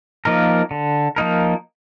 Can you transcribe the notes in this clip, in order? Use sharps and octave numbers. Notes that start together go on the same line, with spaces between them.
F3 A#3 D#4 A#4
D3
F3 A#3 D#4 A#4